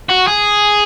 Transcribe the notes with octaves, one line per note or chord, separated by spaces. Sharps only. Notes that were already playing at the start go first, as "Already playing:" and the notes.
F#4
G#4